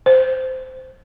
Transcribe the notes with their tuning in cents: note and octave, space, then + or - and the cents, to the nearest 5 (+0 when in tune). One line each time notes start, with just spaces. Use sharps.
C5 -15